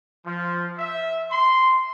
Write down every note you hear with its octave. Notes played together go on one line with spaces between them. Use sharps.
F3
E5
C6